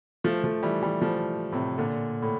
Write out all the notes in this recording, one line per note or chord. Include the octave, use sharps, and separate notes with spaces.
F3 A3
F3 A3
E3 G3
E3 G3
F3 A3
A2 C3
A#2 D3
A2